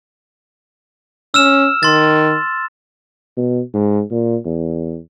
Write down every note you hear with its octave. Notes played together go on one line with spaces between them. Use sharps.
C#4 E6 F6 E7
D#3 C6 A6
B2
G#2
A#2
E2